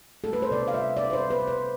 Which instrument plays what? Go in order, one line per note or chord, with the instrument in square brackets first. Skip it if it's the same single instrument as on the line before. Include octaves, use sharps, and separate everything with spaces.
[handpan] A4
G3 B4
C5
C3 D5
F5
G3 E5
C3 D5
B4
C5
G3
B4
C3
C5